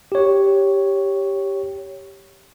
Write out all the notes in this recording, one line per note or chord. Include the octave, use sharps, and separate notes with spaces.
G4 C#5